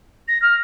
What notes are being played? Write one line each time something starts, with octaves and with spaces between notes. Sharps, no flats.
A#6
F6